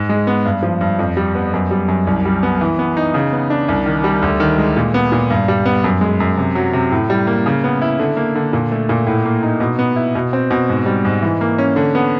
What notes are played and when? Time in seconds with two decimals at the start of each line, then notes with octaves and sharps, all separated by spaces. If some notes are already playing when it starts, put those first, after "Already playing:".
Already playing: G#2
0.09 G#3
0.27 B3
0.45 G2
0.63 F3
0.81 G2
0.99 F2
1.17 G3
1.35 B3
1.53 F#2
1.71 G3
1.88 F#2
2.07 C2
2.25 G3
2.43 B3
2.61 E3
2.79 B3
2.97 D#4
3.14 C#3
3.33 B3
3.50 D4
3.68 C2
3.86 D#3
4.04 G3
4.22 D2
4.40 D#3
4.58 G#3
4.77 A#2
4.94 B3
5.12 A#2
5.30 G2
5.48 G3
5.65 B3
5.84 F#2
6.01 G#3
6.20 F#2
6.37 C3
6.55 F#3
6.73 C3
6.92 A2
7.10 G3
7.27 A#3
7.46 C#3
7.64 B3
7.82 E4
7.99 D3
8.17 A#3
8.35 D3
8.53 A#2
8.72 A3
8.89 A#2
9.06 A2
9.25 A#3
9.43 D#4
9.60 B2
9.79 B3
9.96 E4
10.15 B2
10.33 C4
10.51 B2
10.69 G#2
10.86 G3
11.05 G#2
11.22 E3
11.41 A#3
11.58 C#4
11.76 D3
11.95 B3